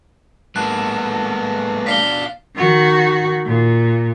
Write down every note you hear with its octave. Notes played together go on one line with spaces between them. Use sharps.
G#3 A#3 B3 A4 F#6
B2 D4 F5 B6 C7 G7
D#3 F#4
A#2